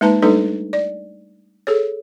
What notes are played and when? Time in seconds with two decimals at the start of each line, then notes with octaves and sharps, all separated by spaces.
0.01 G#3 A#3 D#4 B4 A5 A#5
0.22 G3 A3 D4 D#4 A4 B4
0.73 D5
1.67 G#4 A4 C#5